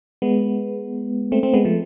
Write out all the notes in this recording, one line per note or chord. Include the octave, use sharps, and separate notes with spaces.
G#3 B3
A3 C4
A3 C4
G#3 B3
F3 A3